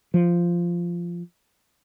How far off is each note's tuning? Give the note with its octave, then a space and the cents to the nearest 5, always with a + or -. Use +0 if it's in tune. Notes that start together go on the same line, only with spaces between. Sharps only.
F3 -10